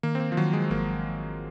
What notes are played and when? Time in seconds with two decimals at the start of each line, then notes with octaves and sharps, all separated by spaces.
0.03 D#3 A#3
0.15 C4
0.20 A#3
0.32 F3
0.37 D#3 F#3
0.53 G#3
0.70 G#1 A#3